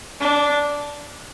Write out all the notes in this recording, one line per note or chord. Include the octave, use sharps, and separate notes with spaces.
D4